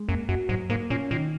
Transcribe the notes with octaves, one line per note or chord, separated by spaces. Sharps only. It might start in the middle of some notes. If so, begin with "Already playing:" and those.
Already playing: G#3
F#2 A#3
F#2 F#4
G#2 F#3
G#2 A#3
A#2 C#4
A#2 D#3